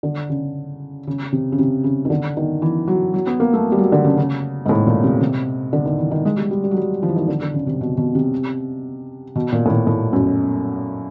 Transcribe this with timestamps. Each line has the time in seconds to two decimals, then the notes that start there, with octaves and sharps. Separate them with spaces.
0.03 D3
0.29 C#3
1.07 C#3
1.32 C3
1.52 C#3
1.59 C3
1.84 C#3
2.05 D#3
2.10 D3
2.37 D#3
2.62 E3
2.88 F#3
3.14 F#3
3.27 B3
3.40 A#3
3.53 A3
3.72 G3
3.78 F#3
3.92 D3
4.04 C#3
4.17 C#3
4.66 G#2
4.69 A2
4.87 A#2
5.04 C3
5.21 C3
5.73 D3
5.85 D#3
5.98 E3
6.11 D#3
6.25 G#3
6.37 G3
6.51 G3
6.64 G3
6.71 F#3
6.77 G3
7.03 F3
7.08 E3
7.16 D#3
7.28 D3
7.42 D3
7.54 C#3
7.67 C3
7.81 B2
7.97 B2
8.15 C3
9.35 B2
9.53 A#2
9.66 A2
9.71 A#2
9.87 A2
10.13 F#2